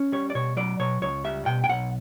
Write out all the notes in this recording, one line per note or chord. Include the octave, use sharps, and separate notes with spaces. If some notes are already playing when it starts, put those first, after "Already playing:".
Already playing: C#4
G3 C#5
D5
B2 C#5
F#3 D5
B2 C#5
C#2 C#5
G3 E5
B2 G5
G5
B1 F#5